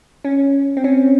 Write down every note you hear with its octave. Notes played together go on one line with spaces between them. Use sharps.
C#4
C4
C#4